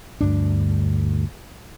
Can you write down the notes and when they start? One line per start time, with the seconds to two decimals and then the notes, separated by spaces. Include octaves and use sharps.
0.21 D2 G2 D4